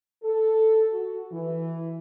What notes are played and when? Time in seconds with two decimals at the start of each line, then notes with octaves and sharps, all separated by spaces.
0.22 A4
0.92 F#4
1.32 E3